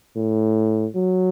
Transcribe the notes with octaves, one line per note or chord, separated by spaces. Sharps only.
A2
F#3